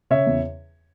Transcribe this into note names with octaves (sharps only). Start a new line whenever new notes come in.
C#3 C#5 E5
E2